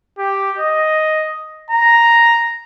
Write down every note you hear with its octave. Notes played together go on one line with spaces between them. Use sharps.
G4
D#5
A#5